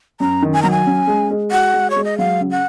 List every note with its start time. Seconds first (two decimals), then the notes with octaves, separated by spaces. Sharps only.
0.20 F#2 A#5
0.42 D#3
0.53 G#5
0.62 F#3 A#5
0.71 G#5
0.87 C#4
1.07 G#3
1.31 G#3
1.52 F#4 F#5
1.74 G#3
1.90 C#5
1.96 G#3
2.04 D#5
2.18 F#3 F5
2.41 C#3
2.51 F#5